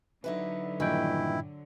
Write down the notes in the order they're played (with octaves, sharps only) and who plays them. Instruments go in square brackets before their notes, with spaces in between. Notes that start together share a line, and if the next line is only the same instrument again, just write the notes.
[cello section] D3 F#3 [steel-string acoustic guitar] D#4 E4 B4
[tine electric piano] G2 A#2 G5 [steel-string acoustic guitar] D#3 E3 [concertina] E4